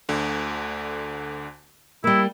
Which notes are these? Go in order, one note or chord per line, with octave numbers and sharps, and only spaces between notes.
D2 D3
G3 A#3 E4